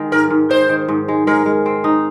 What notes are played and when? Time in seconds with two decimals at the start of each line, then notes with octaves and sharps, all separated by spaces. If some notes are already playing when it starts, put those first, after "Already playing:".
Already playing: D#3 G#3
0.12 G#2 A#4
0.30 G#2
0.50 D#3 C5
0.69 D#3
0.88 G#2
1.08 G#3
1.27 G#3 A#4
1.46 G#3
1.66 C4
1.84 D#4